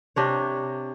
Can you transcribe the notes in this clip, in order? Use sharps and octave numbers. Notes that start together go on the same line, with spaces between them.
C3 D4 C#5